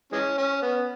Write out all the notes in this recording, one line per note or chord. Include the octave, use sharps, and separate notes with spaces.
E3 G#3 C#4
C#4
B3